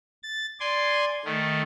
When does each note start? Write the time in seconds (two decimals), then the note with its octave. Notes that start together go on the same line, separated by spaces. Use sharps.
0.23 A6
0.60 D5 G#5 C6
1.25 D#3 A3